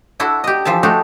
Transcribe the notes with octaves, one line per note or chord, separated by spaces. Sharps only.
D4 E4 F#4 A4
G4 D#5
E3 F3 E5 A5
A3 D4 D#4 F#4 G4 A4